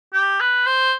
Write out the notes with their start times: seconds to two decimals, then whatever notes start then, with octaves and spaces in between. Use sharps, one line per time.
0.13 G4
0.40 B4
0.66 C5